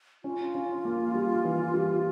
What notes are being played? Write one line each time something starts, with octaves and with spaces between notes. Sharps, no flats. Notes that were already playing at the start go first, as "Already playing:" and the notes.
C#4 F4
C#4
A#3
G3
E3
G3